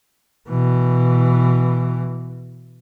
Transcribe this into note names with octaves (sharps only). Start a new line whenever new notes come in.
B2 E3